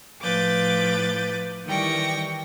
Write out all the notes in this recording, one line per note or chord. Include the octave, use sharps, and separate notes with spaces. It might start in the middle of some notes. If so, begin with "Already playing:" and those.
A2 F3 B4 D6 G6 A6
D#3 E3 G3 G5 C#6 A#6